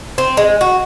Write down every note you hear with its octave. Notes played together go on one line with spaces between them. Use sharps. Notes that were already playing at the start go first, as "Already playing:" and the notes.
C4
G#3
F#4